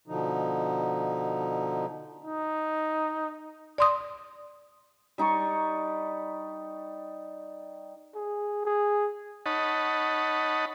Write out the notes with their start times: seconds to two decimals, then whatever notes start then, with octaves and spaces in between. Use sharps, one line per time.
0.08 B2 D3 F3 D#4
2.25 D#4
3.78 D5 C6 D#6
5.18 G3 D#4 D5 C#6
8.15 G#4
8.65 G#4
9.46 D#4 C#5 D#5 F#5 A5 B5